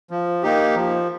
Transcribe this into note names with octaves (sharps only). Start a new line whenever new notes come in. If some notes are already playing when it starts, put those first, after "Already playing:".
F3
A#3 D#4 G4
F3